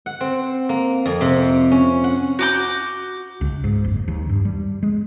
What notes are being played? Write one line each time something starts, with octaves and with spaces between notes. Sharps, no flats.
F#5
C4
A#3
F2
C3
C#4
F#5
F#4 D6 G6
C#2
G#2
F#1
D#2
G2
G3
G#3